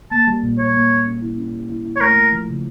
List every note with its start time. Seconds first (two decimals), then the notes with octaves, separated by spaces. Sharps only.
0.11 A#3 A5
0.27 G3
0.43 A#2
0.59 A#2 C#5
0.74 A#3
0.90 G3
1.06 C#4
1.22 E4
1.37 C#4
1.54 G4
1.70 E4
1.85 E4
1.96 C#5
2.01 A3 A#4
2.16 A3
2.32 F3
2.48 C#3